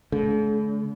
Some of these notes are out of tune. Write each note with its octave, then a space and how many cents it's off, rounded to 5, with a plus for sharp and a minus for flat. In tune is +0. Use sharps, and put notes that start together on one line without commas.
D3 -45 A3 -45